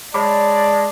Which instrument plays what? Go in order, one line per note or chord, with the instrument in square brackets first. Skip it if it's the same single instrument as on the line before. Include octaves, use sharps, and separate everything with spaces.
[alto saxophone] G#3 [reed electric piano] C#5 B5 D6 [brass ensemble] D5 [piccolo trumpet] A5